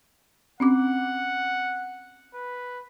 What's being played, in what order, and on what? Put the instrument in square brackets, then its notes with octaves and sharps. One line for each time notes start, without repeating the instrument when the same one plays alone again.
[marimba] C4 C#4 D6 [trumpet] F#5
[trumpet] B4